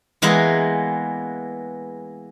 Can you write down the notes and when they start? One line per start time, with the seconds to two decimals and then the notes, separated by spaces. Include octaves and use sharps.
0.22 E3 G#3 A#3 B3 G#4